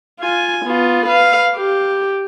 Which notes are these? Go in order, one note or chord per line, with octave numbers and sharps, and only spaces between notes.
F4 G#5
B3 F4
B4 F5
G4